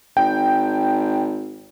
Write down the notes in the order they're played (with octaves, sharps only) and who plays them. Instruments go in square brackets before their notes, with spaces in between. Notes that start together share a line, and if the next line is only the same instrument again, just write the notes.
[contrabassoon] G#1 [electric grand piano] G5